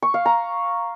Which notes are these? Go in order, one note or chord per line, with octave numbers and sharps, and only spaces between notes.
C#6
F5
A#5